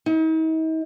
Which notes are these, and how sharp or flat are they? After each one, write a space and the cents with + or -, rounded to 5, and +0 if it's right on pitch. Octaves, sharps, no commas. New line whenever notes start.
D#4 +45